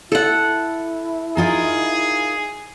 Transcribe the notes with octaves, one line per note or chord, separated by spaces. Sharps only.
E4 A4 F#5
D#4 F4 G#4 A#4